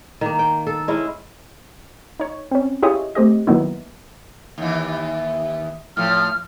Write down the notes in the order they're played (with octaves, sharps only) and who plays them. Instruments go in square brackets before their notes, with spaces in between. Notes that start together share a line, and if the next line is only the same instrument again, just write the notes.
[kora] D#3 A#3
G5
A4
G#3 C#4 E4
[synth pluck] D#4 C#5
C4 C#4
E4 F4 G4 G#4 C#5 D#5
A3 C4 G4 D#5
D#3 F#3 A#3 B3 D#4 E4
[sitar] D#2 E3
[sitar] A2 F3 [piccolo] F6